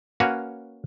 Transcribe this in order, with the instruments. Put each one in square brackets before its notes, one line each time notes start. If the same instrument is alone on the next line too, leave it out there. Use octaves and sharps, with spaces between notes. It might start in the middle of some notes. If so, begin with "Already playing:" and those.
[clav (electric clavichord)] A#3 C#4 F#4 B4 C#5